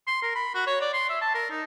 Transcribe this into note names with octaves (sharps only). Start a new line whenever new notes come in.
C6
A#4
B5
F#4
C#5
D5
C6
E5
A5
A#4
D#4